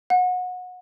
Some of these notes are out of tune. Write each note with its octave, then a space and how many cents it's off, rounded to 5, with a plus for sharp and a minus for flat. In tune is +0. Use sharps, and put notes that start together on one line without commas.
F#5 -25